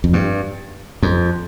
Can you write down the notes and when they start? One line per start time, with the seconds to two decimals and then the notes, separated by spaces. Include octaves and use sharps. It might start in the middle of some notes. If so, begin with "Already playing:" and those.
0.04 F2
0.13 G2
1.03 F2